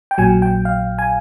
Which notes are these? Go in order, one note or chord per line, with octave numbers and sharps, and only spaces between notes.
G5
A#1 A#2 F#3 G#5
G5
F5
G#5